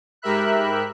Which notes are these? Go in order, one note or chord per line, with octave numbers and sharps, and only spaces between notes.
G#2 G4 A#4 E5 B5 F#6